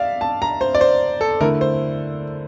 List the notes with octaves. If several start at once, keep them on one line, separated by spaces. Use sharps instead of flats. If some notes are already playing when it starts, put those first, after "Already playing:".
Already playing: D5 E5 F5
A5
A#5
C5
D5
C5
A4
D3 A3 E4 A#4
C5